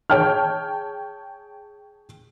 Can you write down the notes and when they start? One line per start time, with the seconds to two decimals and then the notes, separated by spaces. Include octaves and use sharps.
0.10 G#4 C#5 G5 A5 F6